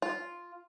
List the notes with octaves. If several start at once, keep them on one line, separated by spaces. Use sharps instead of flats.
F4